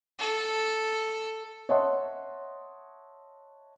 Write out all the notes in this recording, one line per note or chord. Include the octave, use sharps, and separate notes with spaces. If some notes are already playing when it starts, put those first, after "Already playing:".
A4
C#5 D#5 E5 F#5 A5 C6